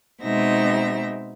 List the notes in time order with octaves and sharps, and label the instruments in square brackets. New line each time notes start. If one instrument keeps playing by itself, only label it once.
[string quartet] B2 G#3 C4 D#4 E5 A#6